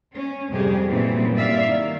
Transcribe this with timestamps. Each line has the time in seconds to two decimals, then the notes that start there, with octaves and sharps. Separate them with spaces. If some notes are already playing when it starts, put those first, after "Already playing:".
0.13 C#4
0.49 F2 G#2 C3 G3 G4 G#4
0.88 F#2 A#2 E3 B3 C4
1.34 G2 D5 E5 F5
1.65 D#3